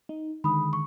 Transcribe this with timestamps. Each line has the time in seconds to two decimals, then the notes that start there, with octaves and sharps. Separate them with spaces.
0.09 D#4
0.44 D3 D#3 G#3 B5 D#6
0.73 C#6